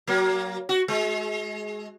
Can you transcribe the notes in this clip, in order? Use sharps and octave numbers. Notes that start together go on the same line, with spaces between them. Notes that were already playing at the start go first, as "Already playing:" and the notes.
F#3 A#3
F#4
G#3